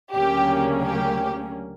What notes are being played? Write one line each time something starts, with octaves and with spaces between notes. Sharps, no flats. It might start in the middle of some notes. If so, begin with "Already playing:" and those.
D2 C#3 F#3 A#3 C#4 G4
G4